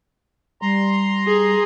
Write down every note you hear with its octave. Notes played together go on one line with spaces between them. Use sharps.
G3 A#5 C6
G#4